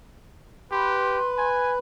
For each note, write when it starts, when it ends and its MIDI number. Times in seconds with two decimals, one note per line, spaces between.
0.71 1.19 67
0.71 1.79 71
0.71 1.49 84
1.38 1.74 80